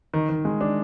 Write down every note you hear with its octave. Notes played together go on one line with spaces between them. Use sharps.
D#3
D#3
G#3
D4